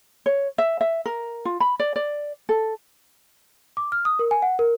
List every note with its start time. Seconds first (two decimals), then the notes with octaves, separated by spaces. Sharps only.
0.26 C#5
0.58 E5
0.81 E5
1.05 A#4
1.45 F4
1.60 B5
1.80 D5
1.96 D5
2.49 A4
3.77 D6
3.92 F6
4.05 D#6
4.19 A#4
4.31 G#5
4.42 F#5
4.59 A#4